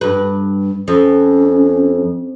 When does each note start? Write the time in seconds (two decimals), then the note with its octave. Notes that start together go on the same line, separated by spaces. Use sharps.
0.01 G2 B4
0.88 F2 C#4